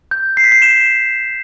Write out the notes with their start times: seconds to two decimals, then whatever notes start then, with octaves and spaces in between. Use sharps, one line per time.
0.11 G6
0.37 C7
0.44 B6
0.52 C7
0.62 E7